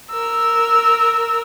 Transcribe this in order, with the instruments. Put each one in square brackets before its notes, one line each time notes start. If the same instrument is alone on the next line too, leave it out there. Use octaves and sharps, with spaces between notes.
[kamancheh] A#4 E6